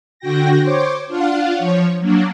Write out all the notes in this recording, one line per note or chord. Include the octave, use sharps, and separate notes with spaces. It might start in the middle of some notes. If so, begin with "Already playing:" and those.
D3 F#4 G5 A#6
C5 C#5 D6
D4 F4 F5 F#5
F3 C#5
F#3 A#3 D4